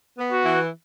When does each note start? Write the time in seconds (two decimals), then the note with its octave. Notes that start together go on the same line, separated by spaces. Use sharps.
0.18 B3
0.31 F#4
0.45 E3